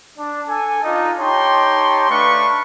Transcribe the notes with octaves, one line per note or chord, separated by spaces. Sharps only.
D4
A4 G#5
D4 D#4 F4
D#4 G4 C#5 G5 A5 C6
A3 D4 B4 F5 C#6